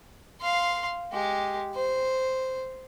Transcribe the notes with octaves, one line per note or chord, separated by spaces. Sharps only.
F5 C6
G#3 G4
C5